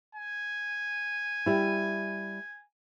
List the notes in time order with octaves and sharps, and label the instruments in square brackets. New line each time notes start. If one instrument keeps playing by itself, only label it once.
[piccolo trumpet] G#5
[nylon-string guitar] G3 E4